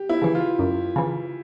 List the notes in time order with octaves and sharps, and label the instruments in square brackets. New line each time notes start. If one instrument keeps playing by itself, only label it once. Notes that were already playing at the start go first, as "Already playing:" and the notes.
Already playing: [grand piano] G4
E4
[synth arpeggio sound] C#3 E3
[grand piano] F4
[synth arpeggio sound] F#2
C#3 E3